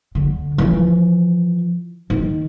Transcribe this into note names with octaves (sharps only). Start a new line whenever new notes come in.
D3
E3 F3
D#3